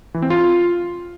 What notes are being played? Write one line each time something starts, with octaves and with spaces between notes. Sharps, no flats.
E3
C4
F4